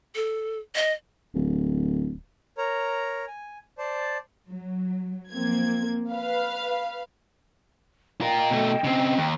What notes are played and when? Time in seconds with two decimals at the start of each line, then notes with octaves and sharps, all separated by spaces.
0.15 A4
0.76 D#5
1.35 D1
2.58 A#4 C#5 A#5
3.28 G#5
3.78 C5 D5 A5
4.50 F#3
5.33 F3 A#3 C4 G#6
6.13 B4 F5
8.21 F4 A#4 D#5 G5
8.50 B2 A3
8.84 C#3 C4
9.18 D#2